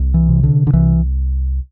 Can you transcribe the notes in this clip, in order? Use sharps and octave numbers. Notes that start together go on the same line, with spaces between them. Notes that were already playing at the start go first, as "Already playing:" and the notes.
Already playing: C2
E3
C3
D3
D3
C2 E3